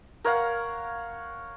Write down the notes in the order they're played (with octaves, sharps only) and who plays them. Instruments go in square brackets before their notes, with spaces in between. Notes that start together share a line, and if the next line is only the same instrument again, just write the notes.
[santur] A#4 C#5 F5 F#5